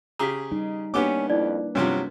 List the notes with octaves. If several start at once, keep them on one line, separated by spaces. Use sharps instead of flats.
C#3 G4 G#4 A#5 B6
G3 D#4
A#3 B3 C#4 D4 G4 B4 D6
F2 D#4 E4 D5
G2 C3 F3 F#3 C#4 C#5